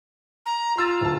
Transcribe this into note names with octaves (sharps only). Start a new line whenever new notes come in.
A#5
F4 C6 E6 A6
D1 A5